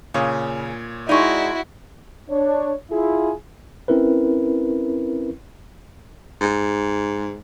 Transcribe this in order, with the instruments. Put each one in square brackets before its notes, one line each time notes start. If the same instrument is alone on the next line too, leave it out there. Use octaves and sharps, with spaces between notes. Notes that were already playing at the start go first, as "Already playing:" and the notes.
[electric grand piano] A#2 C#5 D#6 [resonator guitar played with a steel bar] C#3
[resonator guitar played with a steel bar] G#3 D#4 [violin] E4 F#4 [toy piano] D5 G5 C#6
[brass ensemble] D4 C#5
E4 F4 G#4
[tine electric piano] C4 C#4 E4 A#4 B4
[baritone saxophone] G#2